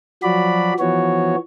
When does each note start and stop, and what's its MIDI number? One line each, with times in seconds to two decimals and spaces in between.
0.23 0.74 53
0.23 0.74 54
0.23 0.74 66
0.23 0.74 74
0.23 0.74 83
0.79 1.36 52
0.79 1.36 53
0.79 1.36 59
0.79 1.36 66
0.79 1.36 73